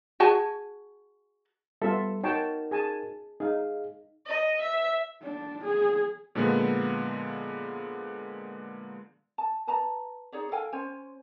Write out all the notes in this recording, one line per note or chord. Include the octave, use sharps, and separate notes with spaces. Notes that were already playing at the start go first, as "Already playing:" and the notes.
F#4 G#4 A5
G3 B3 F4 A4 E5
D#4 F#4 A#4 C#5 G5 A5
G#4 G#5 A5
D#4 G#4 F5
D#5
E5
D4
G#4
A#2 D3 F3 G#3 A#3 B3
A5
B4 A5 A#5
D#4 G#4 C#5 D5
A4 F5 G5 G#5
C#4 C5 C#5 G#5